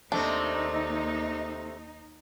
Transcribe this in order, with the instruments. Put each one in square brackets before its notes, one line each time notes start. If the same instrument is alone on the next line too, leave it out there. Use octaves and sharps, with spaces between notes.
[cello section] D#2 D#4 [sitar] C3 A3 C4 [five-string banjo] D4